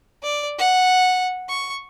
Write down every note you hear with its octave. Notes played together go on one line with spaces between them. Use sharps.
D5
F#5
C#6